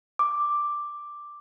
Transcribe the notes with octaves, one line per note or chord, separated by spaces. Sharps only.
D6